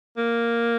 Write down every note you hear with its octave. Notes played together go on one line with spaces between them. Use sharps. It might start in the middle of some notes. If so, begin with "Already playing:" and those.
A#3